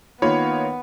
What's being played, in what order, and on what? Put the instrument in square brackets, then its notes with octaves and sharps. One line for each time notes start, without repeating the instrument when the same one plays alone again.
[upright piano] D#3 A#3 B5 [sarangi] B3 [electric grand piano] D#4 F4 C#5